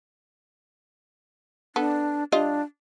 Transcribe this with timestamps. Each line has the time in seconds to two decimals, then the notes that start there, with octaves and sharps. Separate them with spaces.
1.76 B3 D4 A4
2.32 G3 D4 F4 D#5